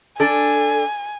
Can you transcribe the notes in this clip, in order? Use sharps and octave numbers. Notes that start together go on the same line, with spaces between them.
D4 A4 G#5